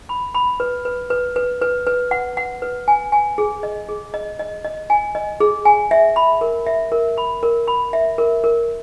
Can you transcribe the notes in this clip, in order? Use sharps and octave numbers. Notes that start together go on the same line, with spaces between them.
B5
B5
B4
B4
B4
B4
B4
B4
F#5
F#5
B4
G#5
G#5
G#4
D#5
G#4
D#5
D#5
D#5
G#5
D#5
G#4
G#5
E5
B5
A#4
E5
A#4
B5
A#4
B5
E5
A#4
A#4